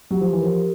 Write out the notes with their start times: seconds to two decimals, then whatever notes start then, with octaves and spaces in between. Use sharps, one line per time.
0.11 F#3 G4
0.21 F3
0.33 E3
0.39 F3 A#4